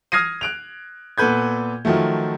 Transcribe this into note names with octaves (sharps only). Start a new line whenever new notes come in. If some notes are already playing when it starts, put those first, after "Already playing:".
D#6 F6 G#6 A#6 C7 D#7
F#6 D7 F7
A#2 B3 A4 B4 G6 G#6
D#3 F3 F#3 A3